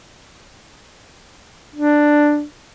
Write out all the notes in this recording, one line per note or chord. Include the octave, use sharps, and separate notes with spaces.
D4